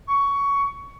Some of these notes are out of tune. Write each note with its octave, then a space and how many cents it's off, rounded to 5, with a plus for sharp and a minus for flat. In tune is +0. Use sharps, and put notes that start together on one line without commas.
C#6 +15